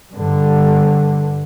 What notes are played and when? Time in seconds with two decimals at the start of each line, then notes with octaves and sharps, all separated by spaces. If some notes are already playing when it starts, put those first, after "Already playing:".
0.13 G2 D3